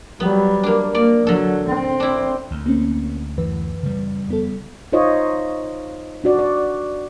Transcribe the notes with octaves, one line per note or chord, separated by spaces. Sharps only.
F#3 G3 B3
A#3 D4
A#3 D5
D3 F#3 A4
C4
D4 E4
D2
A#3 C4 C#4
F#2 E3 B4
C#3 G3
F2 B3 A4
D#4 F4 C5 C#5 D#5
D4 F#4 D5
D5